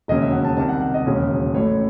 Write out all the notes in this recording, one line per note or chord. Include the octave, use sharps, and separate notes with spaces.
E1 D#2 C#3 F#3 C#4 D#5
E5
F#5
A5
C2 C3 D#3 A5
F#5
F#5
D#5
E1 D#2 C#3 F#3 C#4
A1 A2 F#3 A3 C#5